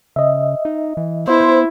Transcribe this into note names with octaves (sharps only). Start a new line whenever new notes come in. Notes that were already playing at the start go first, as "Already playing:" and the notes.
C#3 D#5 E5
D#4
E3
B3 E4 C5